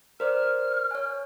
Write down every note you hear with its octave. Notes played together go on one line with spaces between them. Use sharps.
A#4 C5 D5 F6
C#5 G#5